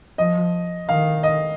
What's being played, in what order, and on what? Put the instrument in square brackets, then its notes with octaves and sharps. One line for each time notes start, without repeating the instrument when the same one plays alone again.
[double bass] F3 [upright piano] D#5
[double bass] D#3 [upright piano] F5
[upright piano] D#5